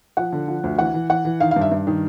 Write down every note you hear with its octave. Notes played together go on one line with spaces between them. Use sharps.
F3 F#5
D3
F3
D2
E3 F#5
E3
E3 F#5
E3
D#3 F5
F5
G2
E5
G2
D#3